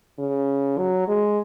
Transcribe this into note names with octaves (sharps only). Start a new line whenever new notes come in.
C#3
F#3
G#3